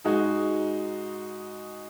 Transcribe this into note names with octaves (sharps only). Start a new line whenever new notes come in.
G#2 G#3 D#4 F#4